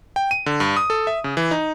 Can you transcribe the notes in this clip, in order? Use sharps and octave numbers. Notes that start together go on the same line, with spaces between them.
G5
D#7
D3
G2
D#6
A4
E5
C#3
E3
D#4